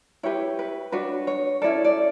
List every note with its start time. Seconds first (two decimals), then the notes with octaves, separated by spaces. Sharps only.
0.23 E4 G4 B4 C#5
0.59 B4
0.92 D4 F#4 B4 C#5
1.27 C#5
1.62 C#4 E4 A4 D5
1.85 D5